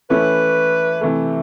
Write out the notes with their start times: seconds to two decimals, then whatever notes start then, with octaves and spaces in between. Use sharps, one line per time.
0.10 E3 A3 C#4 E4 B4
1.01 C3 E3 A3